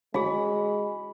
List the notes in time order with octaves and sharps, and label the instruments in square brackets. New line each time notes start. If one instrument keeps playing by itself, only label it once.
[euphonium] G#3 [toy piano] F#4 G#4 [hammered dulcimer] B5